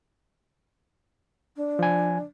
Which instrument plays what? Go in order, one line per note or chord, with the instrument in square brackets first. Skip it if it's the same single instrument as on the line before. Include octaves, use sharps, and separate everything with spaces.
[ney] D4
[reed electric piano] F3 G#5